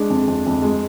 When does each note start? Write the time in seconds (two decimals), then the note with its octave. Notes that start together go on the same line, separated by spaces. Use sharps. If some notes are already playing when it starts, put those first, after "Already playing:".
Already playing: G#3 D4
0.10 F2
0.28 F2
0.46 F2
0.62 G#3